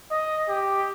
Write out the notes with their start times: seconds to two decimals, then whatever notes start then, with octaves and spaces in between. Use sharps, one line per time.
0.11 D#5
0.49 G4